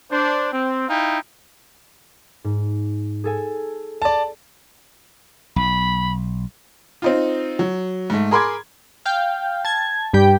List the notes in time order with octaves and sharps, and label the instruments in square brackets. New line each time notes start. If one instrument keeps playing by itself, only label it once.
[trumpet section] D4 C5
C4
D#4 E4 F5 G5
[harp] G#2
G#4 A4 G#5
[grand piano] D5 A5
[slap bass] B1 [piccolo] B5
[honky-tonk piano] C4 D#4 F4
F#3
G#2 A3
G#4 A#4 B5 C6 D6 G#6
[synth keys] F5 G5
A5 G#6
G2 G3 G4 G5